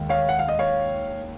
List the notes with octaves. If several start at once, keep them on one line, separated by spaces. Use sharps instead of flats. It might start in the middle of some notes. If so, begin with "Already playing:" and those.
Already playing: D#2 D#3 G#3
C#5 F5
F#5
F5
D#5
C#5 F5